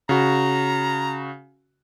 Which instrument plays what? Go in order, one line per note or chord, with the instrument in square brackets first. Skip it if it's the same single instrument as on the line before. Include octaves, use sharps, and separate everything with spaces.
[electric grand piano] C#3 F#4 [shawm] A#5